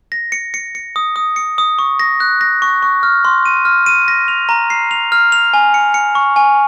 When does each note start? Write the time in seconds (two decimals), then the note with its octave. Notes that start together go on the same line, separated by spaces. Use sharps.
0.12 A#6
0.32 C#7
0.54 C#7
0.75 C#7
0.96 D#6
1.16 D#6
1.36 C#7
1.58 D#6
1.79 C#6
2.00 A#6
2.20 F#6
2.41 A#6
2.62 C#6
2.82 C#6
3.03 F6
3.25 C6
3.46 D#7
3.65 F6
3.86 D#7
4.08 A#6
4.28 F7
4.49 A#5
4.70 C7
4.91 F7
5.12 F6
5.32 F7
5.54 G#5
5.74 C#7
5.94 C#7
6.15 C#6
6.36 G#5